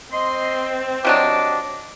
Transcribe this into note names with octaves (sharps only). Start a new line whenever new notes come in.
C4 D#5 C6
C3 F#3 D4 D#5 D6